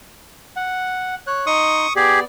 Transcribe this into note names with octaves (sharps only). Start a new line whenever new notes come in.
F#5
C#5 F#6
D#4 D#5 C6 C#6 D#6
B3 G4 G#4 D5